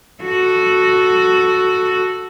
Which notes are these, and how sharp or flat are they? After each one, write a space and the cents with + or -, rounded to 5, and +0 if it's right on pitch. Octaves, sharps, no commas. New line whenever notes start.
F#4 +0 A4 +0